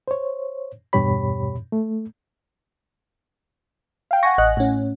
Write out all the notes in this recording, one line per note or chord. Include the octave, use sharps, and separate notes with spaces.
C5 C#5
E2 G2 B2 G4 C#5 B5
A3
F5 G5
F#5 G#5 C#6 A#6
A1 D#5 F#6
A2 C#4